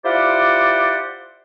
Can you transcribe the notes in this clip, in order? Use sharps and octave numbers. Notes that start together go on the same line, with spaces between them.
E4 F4 G4 C5 D5 F#5